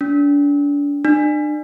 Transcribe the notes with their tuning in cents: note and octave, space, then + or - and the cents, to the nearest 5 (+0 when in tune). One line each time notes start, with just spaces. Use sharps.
D4 -35
D4 +35